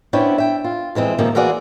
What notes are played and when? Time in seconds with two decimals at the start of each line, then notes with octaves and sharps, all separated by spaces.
0.13 B3 C#4 D4 E4 C5 G5
0.38 E5 G5
0.64 F4
0.95 F2 E3 G#3 C4
1.18 G#2 C3 D#3 F3 A#3
1.35 E3 A#3 F4 F#4 G#4 D5